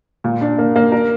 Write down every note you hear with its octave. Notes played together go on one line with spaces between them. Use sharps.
A#2
D4
A#3
A#3
A#4